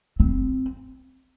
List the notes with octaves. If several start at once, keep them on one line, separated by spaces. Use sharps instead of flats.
C4